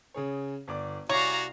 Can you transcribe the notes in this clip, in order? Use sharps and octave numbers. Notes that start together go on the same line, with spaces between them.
C#3 G#4 C#5
G1 D5 D6
C2 F#4 C#5 D5 F5 G#5 A#5